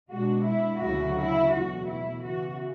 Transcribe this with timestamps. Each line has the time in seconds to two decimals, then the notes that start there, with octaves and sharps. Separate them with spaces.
0.11 B2 G#3 D4 F#4
0.46 E4
0.82 D2 C#3 F#3 C#4 E4 F#4
1.18 E4
1.53 E2 B2 F#3 A3 F#4
1.89 E4
2.24 C#3 E3 B3 F#4